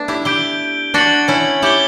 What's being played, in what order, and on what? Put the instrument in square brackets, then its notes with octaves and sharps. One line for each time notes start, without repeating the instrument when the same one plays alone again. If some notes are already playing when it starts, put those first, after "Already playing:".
Already playing: [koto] A3 B3 D4
E4 G4
[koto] E4 G4 [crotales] G6 D7 G7
[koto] D4 F#4 [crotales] A6 C#7 F#7
[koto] C#4 E4
[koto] E4 G4 [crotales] D6 G6 C#7 G7